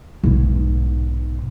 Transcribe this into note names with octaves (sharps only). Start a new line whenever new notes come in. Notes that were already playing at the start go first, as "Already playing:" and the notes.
B1 G#2